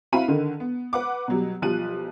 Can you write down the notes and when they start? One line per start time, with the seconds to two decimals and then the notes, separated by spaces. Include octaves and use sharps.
0.12 C4 E4 F#4 F5 B5 D#7
0.28 D3 D#3
0.60 B3
0.93 B4 F#5 D6
1.28 B2 F#3 G3
1.62 B1 F3 G3 F#6 D#7